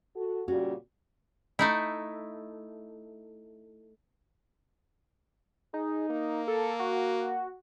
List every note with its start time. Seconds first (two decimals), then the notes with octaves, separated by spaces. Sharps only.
0.16 F#4 A4
0.48 A#2 C#3 G3 C#4 F#4
1.59 A3 D#4 E4
5.74 D#4 G#4
6.10 A#3
6.48 A4
6.79 F#4